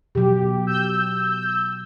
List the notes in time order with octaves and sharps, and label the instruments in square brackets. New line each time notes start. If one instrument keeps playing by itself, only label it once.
[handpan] B2 F#3 [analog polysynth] G4
[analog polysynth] E6 G6